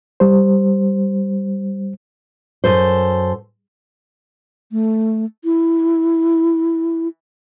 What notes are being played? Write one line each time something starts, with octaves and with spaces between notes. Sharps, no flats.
G3 C5
F#2 A4 C5
A3
E4